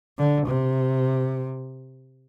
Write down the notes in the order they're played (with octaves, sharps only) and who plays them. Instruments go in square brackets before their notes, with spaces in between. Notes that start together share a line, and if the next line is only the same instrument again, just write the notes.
[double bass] D3
C3